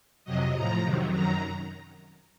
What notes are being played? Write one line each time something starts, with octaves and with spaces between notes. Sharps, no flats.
F2 C3 F#3 D#5
A2 F3 A#5
F2 C3 D#3 F#3
F#2 D#3 F#3 A#5